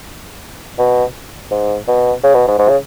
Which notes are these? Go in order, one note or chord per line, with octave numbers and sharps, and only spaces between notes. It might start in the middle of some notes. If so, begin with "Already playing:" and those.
B2
G#2
B2
C#3
B2
G#2
G#2
C#3